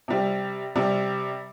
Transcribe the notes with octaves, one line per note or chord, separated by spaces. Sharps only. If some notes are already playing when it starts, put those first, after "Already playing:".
C3 G3 C4
C3 G3 C4